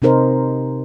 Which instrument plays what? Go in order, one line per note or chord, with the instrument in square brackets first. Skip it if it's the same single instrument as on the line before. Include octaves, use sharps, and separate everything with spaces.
[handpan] C3 C4 D#4 A#4 C5